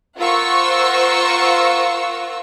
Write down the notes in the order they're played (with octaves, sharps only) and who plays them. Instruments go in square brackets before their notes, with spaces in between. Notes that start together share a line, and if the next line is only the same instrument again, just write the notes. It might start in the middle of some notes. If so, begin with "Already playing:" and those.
[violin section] F4 A#4 C5 F#5 C#6 E6